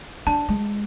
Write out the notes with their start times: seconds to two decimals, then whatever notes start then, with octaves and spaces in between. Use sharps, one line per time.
0.27 D4 A5
0.48 G#3